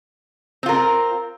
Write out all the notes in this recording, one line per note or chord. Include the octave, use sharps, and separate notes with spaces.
C4 F4 A#4